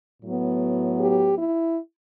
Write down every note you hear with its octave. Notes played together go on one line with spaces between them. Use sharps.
A2 F#3 B3
G4
E4